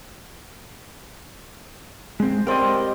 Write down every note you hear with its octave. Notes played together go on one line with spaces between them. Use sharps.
G#3 C4
C4 G4 A#4 D5 D#5